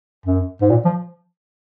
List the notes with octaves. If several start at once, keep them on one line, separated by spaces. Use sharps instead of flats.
F#2
G#2
A#2
F3